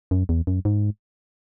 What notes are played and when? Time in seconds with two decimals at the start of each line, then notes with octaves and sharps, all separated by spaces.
0.11 F#2
0.29 E2
0.47 F#2
0.65 G#2